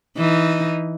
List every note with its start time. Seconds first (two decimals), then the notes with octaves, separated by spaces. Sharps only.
0.17 E3 D#4